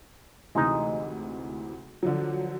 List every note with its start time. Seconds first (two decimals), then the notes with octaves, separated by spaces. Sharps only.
0.55 D2 C3 E3 G#3 D#4
2.03 D3 F3 F#3